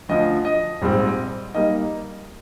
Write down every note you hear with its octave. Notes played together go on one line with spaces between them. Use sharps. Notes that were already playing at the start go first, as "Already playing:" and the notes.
D2 D3 F3 D#5
D#5
A#1 G#2 G3 C4
G3 A#3 D#4 D#5